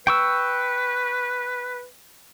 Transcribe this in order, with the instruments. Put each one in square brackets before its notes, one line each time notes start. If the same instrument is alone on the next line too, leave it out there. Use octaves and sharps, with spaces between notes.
[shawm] B4 [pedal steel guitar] G5 C#6 E6